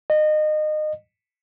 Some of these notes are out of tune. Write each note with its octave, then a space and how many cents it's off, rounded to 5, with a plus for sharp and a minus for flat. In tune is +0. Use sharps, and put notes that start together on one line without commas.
D#5 -25